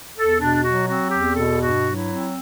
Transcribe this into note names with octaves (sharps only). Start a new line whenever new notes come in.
E2 A4
B2 D4
F#3 F#4
C4 F#4
E2 G4
B2 A4
G2 F#4
F#3
E4
C4